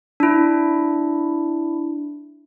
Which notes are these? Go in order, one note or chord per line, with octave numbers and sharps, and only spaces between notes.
D4 E4